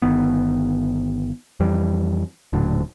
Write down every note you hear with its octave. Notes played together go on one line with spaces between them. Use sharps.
G1 D#3 B3
F2 E3 G3
D#1 A2 D3 F#3